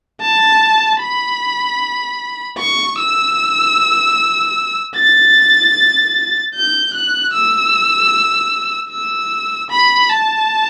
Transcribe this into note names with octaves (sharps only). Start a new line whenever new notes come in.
A5
B5
C#6
E6
A6
G6
F#6
E6
E6
B5
A5